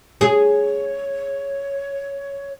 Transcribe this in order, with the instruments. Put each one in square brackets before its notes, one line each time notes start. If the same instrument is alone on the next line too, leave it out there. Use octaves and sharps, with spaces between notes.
[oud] G#4 [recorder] C#5